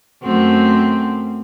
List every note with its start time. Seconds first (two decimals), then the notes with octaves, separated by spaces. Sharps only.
0.22 F#2 A3 C4